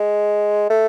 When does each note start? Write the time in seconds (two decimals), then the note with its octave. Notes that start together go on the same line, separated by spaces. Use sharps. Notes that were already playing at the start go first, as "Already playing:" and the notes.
Already playing: G#3
0.70 A3